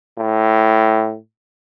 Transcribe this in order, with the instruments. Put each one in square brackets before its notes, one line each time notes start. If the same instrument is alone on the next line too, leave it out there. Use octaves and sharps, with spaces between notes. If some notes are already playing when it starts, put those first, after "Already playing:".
[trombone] A2